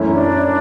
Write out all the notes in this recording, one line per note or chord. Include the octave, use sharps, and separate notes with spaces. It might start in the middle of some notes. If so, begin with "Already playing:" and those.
Already playing: F#2 E3 A3 C#4 E4
D4